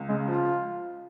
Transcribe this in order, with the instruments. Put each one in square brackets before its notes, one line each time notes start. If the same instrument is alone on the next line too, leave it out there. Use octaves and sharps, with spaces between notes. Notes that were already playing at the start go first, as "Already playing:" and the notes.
Already playing: [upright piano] C#2
[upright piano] C#3 [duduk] G#3
[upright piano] F3 [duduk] F4